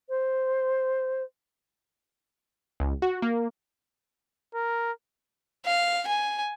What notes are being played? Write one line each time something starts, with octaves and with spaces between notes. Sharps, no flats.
C5
C#2
F#4
A#3
A#4
F5
G#5